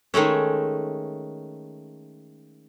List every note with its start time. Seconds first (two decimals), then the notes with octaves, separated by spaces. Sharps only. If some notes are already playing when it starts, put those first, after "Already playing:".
0.14 D#3 G#3 A3 C#4